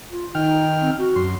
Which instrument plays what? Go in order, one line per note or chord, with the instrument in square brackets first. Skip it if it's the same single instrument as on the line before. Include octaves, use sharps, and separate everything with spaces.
[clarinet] F4
[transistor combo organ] D#3 G5 F6 [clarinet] D#4
[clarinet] C4
F#4
[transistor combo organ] F#2 C6